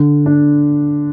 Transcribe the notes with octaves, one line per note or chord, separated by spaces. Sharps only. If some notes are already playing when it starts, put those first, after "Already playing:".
Already playing: D3
D4